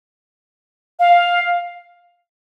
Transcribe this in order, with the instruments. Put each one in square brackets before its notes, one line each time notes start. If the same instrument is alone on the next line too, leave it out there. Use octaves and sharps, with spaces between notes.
[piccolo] F5